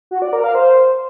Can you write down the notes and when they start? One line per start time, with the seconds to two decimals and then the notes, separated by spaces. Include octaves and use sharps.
0.11 F#4
0.22 D5
0.33 A#4
0.44 F5
0.55 C5